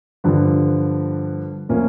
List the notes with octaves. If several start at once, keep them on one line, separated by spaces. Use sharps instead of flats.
G2 D3 F3
A2 F3 A#3 C#4